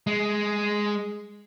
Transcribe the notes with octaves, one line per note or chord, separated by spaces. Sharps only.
G#3